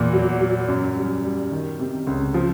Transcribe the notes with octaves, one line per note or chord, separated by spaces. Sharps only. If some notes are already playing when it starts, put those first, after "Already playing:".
Already playing: E2 A#2
F#3
F#3
F#2
G3
G3
D#3
C3
C#2
F3